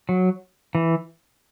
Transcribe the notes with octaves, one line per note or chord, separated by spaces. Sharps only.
F#3
E3